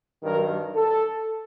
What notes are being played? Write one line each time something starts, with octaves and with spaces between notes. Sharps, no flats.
G2 D#3 F#3 A#4
A4